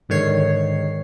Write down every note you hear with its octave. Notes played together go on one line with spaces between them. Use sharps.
G#2 D3 D#3 C#5 C7